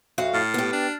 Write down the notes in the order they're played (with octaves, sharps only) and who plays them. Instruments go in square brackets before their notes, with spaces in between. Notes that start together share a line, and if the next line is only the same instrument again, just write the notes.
[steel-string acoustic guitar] F2 F#4 F5
[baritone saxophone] A2 [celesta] F6 A6 C7
[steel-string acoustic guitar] B3 G4
[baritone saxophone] D4